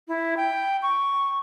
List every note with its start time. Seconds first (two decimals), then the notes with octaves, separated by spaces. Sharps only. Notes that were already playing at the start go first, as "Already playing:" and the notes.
0.08 E4
0.37 G5
0.82 C#6